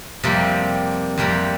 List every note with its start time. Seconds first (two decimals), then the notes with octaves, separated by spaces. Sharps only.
0.23 F2 C3 G3 A#3
1.18 F2 C3 G3 A#3